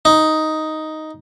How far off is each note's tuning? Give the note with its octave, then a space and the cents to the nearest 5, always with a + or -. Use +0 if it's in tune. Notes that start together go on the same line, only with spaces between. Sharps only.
D#4 +5